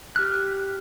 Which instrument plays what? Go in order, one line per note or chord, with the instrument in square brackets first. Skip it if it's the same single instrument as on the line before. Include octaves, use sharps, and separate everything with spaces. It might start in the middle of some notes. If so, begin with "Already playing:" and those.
[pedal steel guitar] G4 F6 F#6